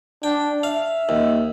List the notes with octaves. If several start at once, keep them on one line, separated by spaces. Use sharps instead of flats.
D4 G5
E5 F5
D#2